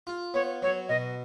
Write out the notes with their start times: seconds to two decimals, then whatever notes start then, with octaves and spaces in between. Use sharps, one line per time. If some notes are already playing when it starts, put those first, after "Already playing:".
0.07 F4
0.34 B3 C#5
0.62 F#3 C#5
0.89 B2 D#5